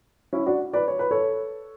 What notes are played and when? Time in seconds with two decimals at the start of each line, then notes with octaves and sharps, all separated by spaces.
0.33 C#4 E4
0.46 D4 F#4
0.73 B4 D5
0.88 C#5
0.99 B4
1.11 A4 C#5